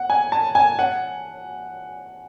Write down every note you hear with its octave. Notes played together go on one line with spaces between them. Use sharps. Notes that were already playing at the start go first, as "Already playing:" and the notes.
Already playing: F#5
G#5
A5
G#5
F#5